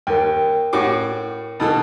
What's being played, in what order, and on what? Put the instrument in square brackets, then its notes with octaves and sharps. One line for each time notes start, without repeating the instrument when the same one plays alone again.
[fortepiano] D#2 [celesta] A#4 G5
[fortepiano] A2 F#4 D6
B2 E3 A4